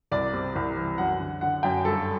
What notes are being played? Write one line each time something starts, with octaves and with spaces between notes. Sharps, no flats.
C2 D5
C3
C2
E3
F#2 F#5
D3
D3 F#5
F#2 G5
G2 A4